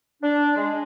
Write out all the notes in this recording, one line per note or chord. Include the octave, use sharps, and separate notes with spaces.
D4
G#3